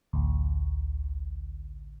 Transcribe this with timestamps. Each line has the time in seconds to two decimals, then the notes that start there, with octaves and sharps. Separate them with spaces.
0.13 A1 D2